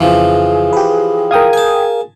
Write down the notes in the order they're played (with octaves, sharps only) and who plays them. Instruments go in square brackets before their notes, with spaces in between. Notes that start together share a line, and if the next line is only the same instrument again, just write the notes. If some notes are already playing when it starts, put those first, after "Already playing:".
[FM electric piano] F2 C#3 [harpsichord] E3 F3 [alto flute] G#4
[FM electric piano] G4 B4
[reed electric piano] A#4 F5 [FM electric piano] G5 D#6 G#6
[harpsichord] G#5 A5